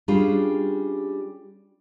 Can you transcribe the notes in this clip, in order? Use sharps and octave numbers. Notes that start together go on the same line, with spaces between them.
G3 C#4 D4 F4 G4 G#4